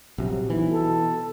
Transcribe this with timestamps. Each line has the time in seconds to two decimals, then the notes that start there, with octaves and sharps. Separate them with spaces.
0.18 A#1 C3 F#3
0.50 B1 E3
0.70 B2 A4